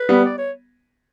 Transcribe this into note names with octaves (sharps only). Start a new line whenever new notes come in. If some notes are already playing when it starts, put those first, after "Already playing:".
Already playing: B4
G3 B3
D5
C#5